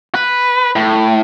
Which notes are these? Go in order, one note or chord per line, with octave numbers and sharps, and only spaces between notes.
B4
A2